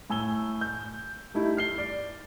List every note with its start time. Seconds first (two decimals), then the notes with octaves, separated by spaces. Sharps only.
0.10 A2 G#5 E6 G7
0.61 G6
1.34 G3 A3 D#4 E4
1.57 F6 C7 G7
1.78 D5